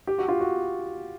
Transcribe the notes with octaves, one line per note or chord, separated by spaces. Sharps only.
G4
F#4
F4
F#4